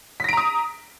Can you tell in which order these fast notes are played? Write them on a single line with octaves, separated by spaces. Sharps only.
B6 A#6 D7 A#5 D#6